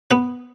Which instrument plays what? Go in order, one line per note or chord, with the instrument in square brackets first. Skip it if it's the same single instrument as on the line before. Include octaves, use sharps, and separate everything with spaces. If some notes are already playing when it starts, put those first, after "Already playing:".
[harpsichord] B3 B4